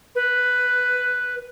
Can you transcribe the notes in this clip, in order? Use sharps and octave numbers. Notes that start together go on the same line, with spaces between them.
B4